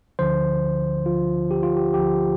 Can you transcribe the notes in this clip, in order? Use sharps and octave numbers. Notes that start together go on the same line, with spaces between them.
D2 D3 F3 C5
D2 D3 F3 F4
G4
F4
G4
D2 D3 F3 G4